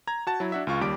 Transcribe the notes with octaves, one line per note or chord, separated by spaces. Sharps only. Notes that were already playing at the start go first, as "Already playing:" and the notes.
A#5 G#6
F#4 A5 A6
F#3 E4
D4 F#4 E5
C#2 F4 C#6
D#2 G3 D6 D7